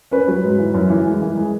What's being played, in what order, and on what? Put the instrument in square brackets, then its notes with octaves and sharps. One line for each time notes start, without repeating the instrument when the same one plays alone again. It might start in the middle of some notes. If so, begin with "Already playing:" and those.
[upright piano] C#4 B4
F#3
G#2
E3
F#2
E3
G#3
E3
G#3